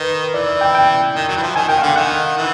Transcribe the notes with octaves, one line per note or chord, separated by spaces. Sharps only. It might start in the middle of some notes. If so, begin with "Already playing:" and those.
Already playing: D#3 B4
E3 D5
G5
G5
D#3
F#3
E3
F3
D#3 G#5
D#3 G5
F#5
D3 F5
D#3 F#5
E3